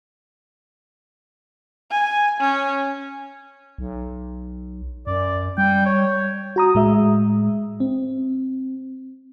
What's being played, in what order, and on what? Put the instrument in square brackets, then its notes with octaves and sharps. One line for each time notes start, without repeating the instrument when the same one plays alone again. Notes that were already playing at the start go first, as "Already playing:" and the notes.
[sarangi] G#5
C#4
[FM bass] B1
[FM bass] F#2 [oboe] D5
[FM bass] G3 [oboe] G5
[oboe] C#5
[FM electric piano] F#4 A#5 D#6
A2 G#3 E5
C4